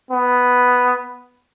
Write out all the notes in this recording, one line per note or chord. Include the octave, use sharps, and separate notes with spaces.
B3